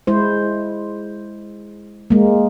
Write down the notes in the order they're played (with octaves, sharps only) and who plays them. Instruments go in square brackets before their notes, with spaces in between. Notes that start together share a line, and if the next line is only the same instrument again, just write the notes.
[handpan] G#3 E4 C5
G#3 A#3